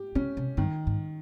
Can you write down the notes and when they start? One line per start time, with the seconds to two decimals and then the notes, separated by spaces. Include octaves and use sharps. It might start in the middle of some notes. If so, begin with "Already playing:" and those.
Already playing: G4
0.15 C#3 C#4
0.37 C3
0.57 G2 D#3
0.87 G#2